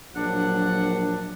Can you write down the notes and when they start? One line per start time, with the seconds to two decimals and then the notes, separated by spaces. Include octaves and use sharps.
0.15 A#1 F#3 D4 F#5